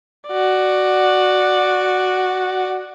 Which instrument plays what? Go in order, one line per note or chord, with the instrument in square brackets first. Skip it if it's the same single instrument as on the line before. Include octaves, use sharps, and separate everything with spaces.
[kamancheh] F#4 D5